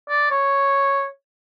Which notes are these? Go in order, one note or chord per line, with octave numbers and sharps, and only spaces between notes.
D5
C#5